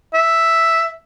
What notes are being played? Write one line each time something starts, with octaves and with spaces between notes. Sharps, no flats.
E5